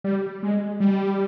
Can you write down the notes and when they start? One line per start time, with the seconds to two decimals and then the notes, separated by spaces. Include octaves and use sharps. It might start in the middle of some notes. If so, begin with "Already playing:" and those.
0.04 G3
0.43 G#3
0.80 G3